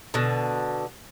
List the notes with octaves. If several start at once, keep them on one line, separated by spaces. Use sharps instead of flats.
B2 D3